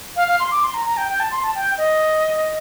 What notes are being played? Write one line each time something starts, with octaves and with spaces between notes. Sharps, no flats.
F5
F5
C6
D6
C6
A#5
A#5
G5
G5
A5
C6
A5
G5
D#5